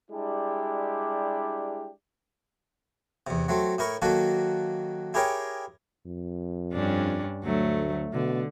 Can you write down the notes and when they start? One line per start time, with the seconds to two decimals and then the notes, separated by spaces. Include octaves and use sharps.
0.11 G3 G#3 D4 E4 G4
3.27 E2 C3
3.48 F#3 A3 C4
3.78 A2 E4 A#4 C#6
4.02 D#3 F#3 A#3 F#4 A4
5.14 E4 G4 G#4 A#4 C#5 G5
6.06 F2
6.73 G2 C#4 D4
7.44 D2 F#3 A3
8.13 B2 D3